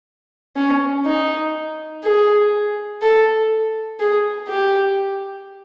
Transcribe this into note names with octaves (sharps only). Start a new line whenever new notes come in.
C#4
D#4
G#4
A4
G#4
G4